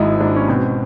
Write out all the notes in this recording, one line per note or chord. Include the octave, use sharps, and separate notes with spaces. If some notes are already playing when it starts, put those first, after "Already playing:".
Already playing: G#1 G#2 D#4 E4
G#2 D4
C#4
B2 C4